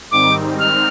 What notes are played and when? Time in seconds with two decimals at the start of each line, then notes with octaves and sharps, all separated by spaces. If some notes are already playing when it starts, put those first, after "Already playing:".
0.11 G#2 D#3 G3 C4 D#4 D6
0.59 F6